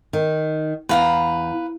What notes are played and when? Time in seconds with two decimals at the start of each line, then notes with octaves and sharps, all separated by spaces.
0.13 D#3
0.89 E2 B4 F5 A#5